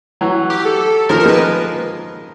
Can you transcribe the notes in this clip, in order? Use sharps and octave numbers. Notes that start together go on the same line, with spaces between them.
E3 F#3
G4
A4
D#3 F3 A#4
A#4
G#3 A#3
B4